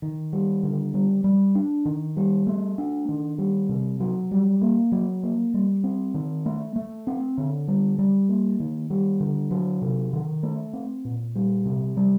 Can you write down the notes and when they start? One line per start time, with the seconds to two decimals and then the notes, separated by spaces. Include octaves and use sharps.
0.02 D#3
0.33 G3
0.63 D3
0.94 G3
1.24 G3
1.55 D4
1.85 D#3
2.17 G3
2.47 A3
2.78 D4
3.08 D#3
3.38 G3
3.69 C3
4.00 F#3
4.31 G3
4.61 A#3
4.92 F#3
5.23 A#3
5.54 G3
5.84 C4
6.14 D#3
6.46 A3
6.76 A3
7.07 C4
7.38 D3
7.68 G3
7.98 G3
8.29 A#3
8.60 D#3
8.90 G3
9.20 D3
9.51 F#3
9.82 C3
10.13 D#3
10.43 A3
10.73 C4
11.05 A#2
11.35 G3
11.66 C3
11.97 G3